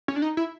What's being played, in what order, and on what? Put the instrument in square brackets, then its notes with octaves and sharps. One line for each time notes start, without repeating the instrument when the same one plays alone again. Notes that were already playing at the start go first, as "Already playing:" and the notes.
[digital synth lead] C#4
D4
D#4
E4